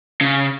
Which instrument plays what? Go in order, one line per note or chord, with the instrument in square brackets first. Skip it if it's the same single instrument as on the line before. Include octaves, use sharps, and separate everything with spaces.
[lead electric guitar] C#3